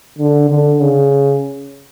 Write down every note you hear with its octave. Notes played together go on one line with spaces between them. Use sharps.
D3
D3
C#3